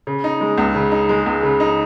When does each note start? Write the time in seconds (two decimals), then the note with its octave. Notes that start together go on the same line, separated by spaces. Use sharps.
0.07 C#3
0.24 D#4
0.41 G#3
0.58 C#2
0.75 C#3
0.92 D#4
1.09 G#3
1.26 C#2
1.43 C#3
1.60 D#4